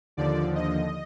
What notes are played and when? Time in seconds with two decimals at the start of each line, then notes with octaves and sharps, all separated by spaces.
0.17 D#2 D3 F3 D5
0.55 D#5